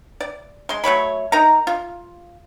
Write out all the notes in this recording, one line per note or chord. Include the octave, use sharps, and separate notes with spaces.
D5
G#3 C6
F#3 A3 C#5 B5
D#4 A#4 A#5
F4